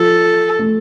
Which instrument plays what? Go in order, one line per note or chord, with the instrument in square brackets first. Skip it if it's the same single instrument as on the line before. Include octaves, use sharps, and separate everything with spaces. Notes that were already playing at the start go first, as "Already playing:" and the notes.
Already playing: [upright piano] F3 [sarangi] A4
[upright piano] A3